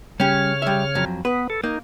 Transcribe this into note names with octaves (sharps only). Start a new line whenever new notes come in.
C#3 G3 C#4 C#5 F6
G3 E5
F2 F#3
B3 B4
A4
A#3 D#4